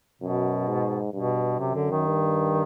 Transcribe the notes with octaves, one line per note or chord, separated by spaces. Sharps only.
F#2 B2
G#2
G2 B2
F#2 C3
D3
D#3
G2